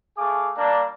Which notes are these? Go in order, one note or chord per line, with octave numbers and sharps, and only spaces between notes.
A3 G#4 F5 D6
G3 A#3 D4